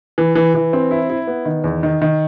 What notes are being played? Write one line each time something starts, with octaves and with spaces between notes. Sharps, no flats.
E3
E3
E3
C4
E4
E4
B3
D#3
E2
D#3
D#3